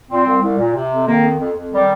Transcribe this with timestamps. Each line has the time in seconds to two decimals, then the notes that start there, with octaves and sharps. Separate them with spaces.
0.09 A#2 C4
0.25 C2
0.42 C2
0.58 A#2
0.74 C3
0.91 F2
1.06 D#3 A#3
1.22 F2
1.39 F2
1.55 F2
1.71 D#3 G3